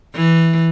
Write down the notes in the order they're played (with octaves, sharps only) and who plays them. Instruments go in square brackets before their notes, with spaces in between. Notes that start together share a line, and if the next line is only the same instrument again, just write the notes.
[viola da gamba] E3